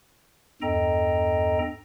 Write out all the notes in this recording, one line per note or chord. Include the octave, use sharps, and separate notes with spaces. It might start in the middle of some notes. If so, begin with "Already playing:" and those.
E2 G2 A4 D#5 G5 A#5